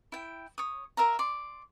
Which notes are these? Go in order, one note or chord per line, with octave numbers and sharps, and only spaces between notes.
E4 G5
C#5 D#6
A#4 E5 F5 A#5
D5 C6